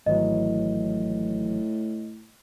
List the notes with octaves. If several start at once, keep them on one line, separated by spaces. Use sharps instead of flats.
G#1 A2 E3 F#3 D#5